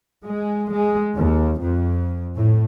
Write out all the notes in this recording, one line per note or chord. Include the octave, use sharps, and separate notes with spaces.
G#3
G#3
D#2
F2
A2